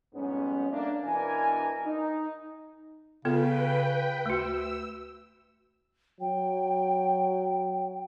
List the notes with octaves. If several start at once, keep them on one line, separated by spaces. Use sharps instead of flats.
F2 G#2 G3 B3 C#4
A3 A#3 D4
B2 E3 D4 A#4 G#5
D#4
C#3 B3 F4 A4 B4 G5
D2 A3 F#4 E6
F#3 G5